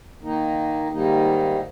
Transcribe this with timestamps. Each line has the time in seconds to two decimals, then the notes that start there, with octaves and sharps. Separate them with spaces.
0.23 D#3 A#3 D#4
0.91 G#2 D#3 G3 A#3 D#4